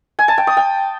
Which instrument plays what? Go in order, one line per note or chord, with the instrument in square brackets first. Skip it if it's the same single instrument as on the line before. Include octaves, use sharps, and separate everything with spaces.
[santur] G#5
A5
G5
D#6
G5